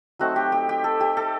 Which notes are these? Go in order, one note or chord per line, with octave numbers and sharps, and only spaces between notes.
F#3 A3 C4 D#4 F#4
G4
G4
G4
A4
G4
A4